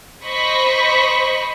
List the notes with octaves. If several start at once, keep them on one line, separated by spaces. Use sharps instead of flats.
C5 D#5 B5 C#6 B6